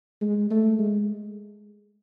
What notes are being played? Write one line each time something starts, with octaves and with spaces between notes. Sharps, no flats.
G#3
A3
G#3